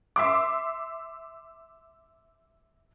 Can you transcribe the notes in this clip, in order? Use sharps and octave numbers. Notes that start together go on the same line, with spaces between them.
E5 C6 D6